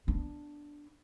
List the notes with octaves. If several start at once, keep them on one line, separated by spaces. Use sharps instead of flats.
B3 D4